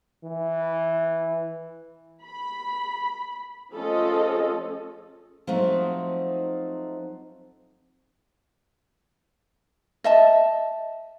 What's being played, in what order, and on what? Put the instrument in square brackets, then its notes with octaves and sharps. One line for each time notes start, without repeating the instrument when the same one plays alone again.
[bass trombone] E3
[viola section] B5
F3 A3 C#4 G#4 A4 D#5
[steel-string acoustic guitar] F3 F#3 A3 C4 D#4
[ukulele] D#5 E5 A5